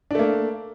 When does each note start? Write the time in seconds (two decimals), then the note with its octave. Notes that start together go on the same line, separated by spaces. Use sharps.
0.11 D4
0.15 A3
0.19 A#3